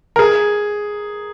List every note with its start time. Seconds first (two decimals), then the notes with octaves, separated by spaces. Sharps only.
0.16 A#4
0.19 G#4